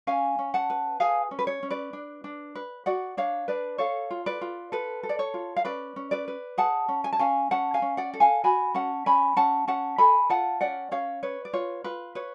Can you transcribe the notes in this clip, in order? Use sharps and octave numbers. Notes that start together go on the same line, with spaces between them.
C#4 F5 G#5
C#4
F#5 A5
B4
G#4 F5 G#5
C#4
B4
C#5
C#4
B4 D5
D4
D4
B4
F#4 D5 F#5
D4 C#5 F5
D4 B4 D5
A4 C#5 F5
F4
B4 D5
F4
A4 B4
A4
D5
C#5
F4
F5
C#4 B4 D5
C#4
B4 D5
B4
G#4 F#5 A5
C#4
G#5
A5
C#4 F5 G#5
C#4 F#5 A5
F5 G#5
C#4
D5 F#5
A4
F5 G#5
F#4 G#5 B5
C#4 F#5 A5
C#4 G#5 B5
C#4 F#5 A5
C#4 F#5 A5
A4 G#5 B5
F4 F#5 A5
C#4 D5 F#5
C#4 C#5 F5
B4 C#5
D5
F4 C#5
F4 B4
B4 C#5